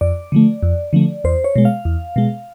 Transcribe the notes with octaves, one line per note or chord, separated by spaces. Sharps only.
F2 D5
D3 F3 A3
F2
D3 F3 A3
E2 C5
C#5
B2 G#3
F5
E2
B2 G#3